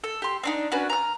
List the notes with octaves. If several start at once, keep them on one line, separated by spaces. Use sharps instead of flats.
A4
G4 C6
C4 D4 D#4
C#4 D4 F#4 B4
A#5 F6